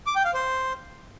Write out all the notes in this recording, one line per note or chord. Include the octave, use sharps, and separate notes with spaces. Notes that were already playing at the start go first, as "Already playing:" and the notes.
D6
G5
F5
C5